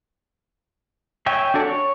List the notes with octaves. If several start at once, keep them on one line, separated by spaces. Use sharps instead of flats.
C#5 E5 G5 G#5
D4 F#4 A4 D5
C#5